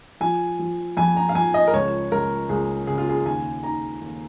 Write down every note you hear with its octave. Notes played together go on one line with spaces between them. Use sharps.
F3 G#5
F3
F2 G#5
A#5
F5
F3 G#5
D#5
A#4
C#2 C#5
C#2 A#4
C#2 G#4
C#3 G#4
F4
G#4
D#2 G#5
D#3 A#5
D#2